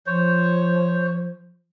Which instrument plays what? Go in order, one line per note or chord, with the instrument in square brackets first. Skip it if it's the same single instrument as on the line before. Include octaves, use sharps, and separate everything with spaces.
[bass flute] F3 [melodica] C5 C#5